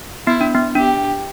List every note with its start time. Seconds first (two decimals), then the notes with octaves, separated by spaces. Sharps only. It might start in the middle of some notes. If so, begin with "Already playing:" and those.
0.27 B3 E4
0.41 D4
0.55 B3
0.75 D4 G4